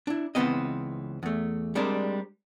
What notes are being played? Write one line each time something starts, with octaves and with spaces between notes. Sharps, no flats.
D4 E4
C#2 D#3 E3 B3 C4 D#5
E2 A3
G3 G#3 C4 D4 A#4